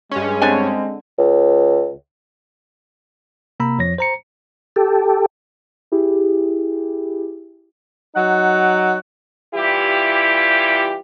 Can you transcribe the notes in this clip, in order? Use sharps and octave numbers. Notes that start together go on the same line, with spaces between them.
G2 G#3 C#4
D3 C4 D4 G#5
C#2
C3 A#3 A#5 B5 E6
F2 F3 C#5 A#6
C5 A#5 C#7
G4 A4
E4 G4 G#4
F#3 D#4 F#5
E3 G3 E4 F4 G4